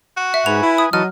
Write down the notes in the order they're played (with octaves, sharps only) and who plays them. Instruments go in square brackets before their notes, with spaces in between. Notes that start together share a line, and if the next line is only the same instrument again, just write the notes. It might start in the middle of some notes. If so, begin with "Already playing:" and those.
[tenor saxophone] F#4
[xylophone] E5 [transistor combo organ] F#5
[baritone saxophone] G#2 [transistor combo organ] B4 G#5 [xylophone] F7
[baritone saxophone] E4
[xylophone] D#6
[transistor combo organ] E3 F#4 A5 [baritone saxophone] F#3 [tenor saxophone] D#5 [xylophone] F6